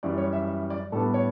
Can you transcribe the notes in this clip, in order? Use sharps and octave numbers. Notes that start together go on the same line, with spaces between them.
F#2 E3 G3 D5
C#5
E5
E5
D5
A2 G3 B3 D4 A4
C#5